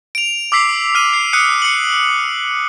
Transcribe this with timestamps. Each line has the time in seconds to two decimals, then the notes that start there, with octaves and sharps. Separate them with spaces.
0.15 D7 F7
0.52 D6 E6 B6 C7
0.95 F6 D#7
1.13 C7
1.33 D#6 F#6 C7 C#7 D#7
1.62 C#7 F#7